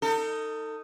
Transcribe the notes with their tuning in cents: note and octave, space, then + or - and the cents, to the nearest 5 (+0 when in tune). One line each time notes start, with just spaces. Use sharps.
D#4 +0 A4 +35